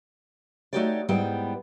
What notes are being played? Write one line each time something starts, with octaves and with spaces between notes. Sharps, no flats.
A3 D#4 F#4 G4 C#5 D5
G#2 G3 B3 E4 G5